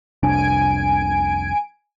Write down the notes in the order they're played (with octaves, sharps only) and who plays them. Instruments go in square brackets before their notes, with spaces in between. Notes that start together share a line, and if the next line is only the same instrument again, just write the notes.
[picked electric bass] F1 C2 D4 [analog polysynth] G#5 D7